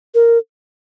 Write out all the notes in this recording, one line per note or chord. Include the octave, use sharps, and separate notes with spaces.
A#4